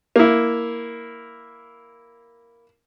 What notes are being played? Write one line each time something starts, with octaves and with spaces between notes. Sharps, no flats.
A#3 E4